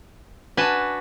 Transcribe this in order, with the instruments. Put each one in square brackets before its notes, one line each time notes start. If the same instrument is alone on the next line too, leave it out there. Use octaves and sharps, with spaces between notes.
[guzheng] D4 F#4 [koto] B4 G#5 A5